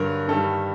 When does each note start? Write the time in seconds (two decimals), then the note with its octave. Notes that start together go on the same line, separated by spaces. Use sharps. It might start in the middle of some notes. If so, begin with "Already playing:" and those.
Already playing: G2 D3 F#3 A#4
0.28 G2 D#3 G3 A4